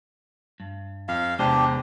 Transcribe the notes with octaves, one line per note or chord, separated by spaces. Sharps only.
G2
F2 F5
E2 C3 G#3 D4 G4 C5 G5 C6